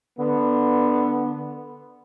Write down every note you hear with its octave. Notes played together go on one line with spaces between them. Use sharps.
D3 B3